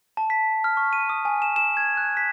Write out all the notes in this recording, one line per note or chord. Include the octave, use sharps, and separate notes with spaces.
A5
B6
F6
C#6
D#7
D#6
G#5
E7
E7
G#6
F#6
B6